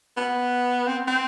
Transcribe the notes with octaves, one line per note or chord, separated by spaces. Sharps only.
B3
C4
C4